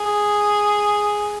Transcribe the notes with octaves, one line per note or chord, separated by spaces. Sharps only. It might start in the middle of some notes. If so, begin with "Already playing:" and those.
Already playing: G#4